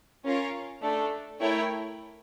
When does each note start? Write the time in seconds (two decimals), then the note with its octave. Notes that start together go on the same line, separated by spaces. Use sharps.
0.25 C#4 F4 A#4 C#5 F5
0.82 A3 D4 A4
1.40 A3 E4 A#4 C#5 G5